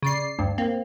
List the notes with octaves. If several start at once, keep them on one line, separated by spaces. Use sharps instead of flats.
C#3 D5 C7
D2 G2
A#3 C4